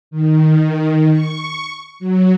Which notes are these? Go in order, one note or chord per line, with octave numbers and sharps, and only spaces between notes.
D#3
C#6
F#3